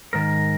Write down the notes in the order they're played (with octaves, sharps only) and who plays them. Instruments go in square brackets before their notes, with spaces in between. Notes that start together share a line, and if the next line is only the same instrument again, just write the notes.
[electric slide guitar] G#2 D#3 A#4